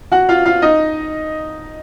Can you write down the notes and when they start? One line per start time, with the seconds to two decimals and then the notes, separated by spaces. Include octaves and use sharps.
0.12 F#4 F#5
0.29 F4 F5
0.46 F4 F5
0.62 D#4 D#5